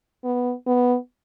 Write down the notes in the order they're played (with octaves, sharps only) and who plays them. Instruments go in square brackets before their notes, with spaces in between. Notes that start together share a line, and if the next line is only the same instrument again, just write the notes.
[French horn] B3
B3